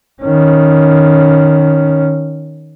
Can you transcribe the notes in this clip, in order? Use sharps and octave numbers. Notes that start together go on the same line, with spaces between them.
D#3 C#4